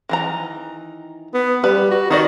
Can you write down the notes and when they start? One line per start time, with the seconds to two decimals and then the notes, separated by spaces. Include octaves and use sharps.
0.09 D#3 E3 A#5
1.34 B3
1.64 G3 B4
1.91 F#4
2.10 D#3 D#4 F#4 D5